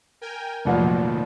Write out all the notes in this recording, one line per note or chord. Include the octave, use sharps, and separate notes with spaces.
A#4 G5 G#5
F1 A#2 D#3 F3 F#3 F#5